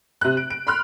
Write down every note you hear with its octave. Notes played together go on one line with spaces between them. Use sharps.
C3 F#6
D7
D7
B5 C6 F6 F#6